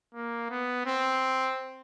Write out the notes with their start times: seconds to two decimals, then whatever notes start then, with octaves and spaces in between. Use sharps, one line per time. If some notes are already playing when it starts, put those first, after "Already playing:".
0.14 A#3
0.50 B3
0.86 C4